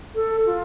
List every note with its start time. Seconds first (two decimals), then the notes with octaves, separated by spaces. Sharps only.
0.15 A4
0.46 F4